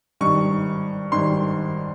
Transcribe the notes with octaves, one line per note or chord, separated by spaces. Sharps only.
G#1 G2 D#3 C#6
G#1 G2 D#3 C6